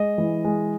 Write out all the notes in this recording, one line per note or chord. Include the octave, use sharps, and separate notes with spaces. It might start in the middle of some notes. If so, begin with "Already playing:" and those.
Already playing: G#3 D#5
E3
G#3